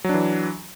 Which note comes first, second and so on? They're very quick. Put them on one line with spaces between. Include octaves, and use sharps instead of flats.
F#3 D4 E3